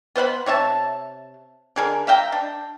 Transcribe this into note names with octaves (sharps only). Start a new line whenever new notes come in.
B3 C5 F5 B5
C3 C#5 E5 A5
D3 G#4 A#4
E5 F5 G5 A#5
D4